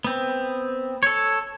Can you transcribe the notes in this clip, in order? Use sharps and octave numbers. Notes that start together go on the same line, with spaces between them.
B3 C4
A4 C#5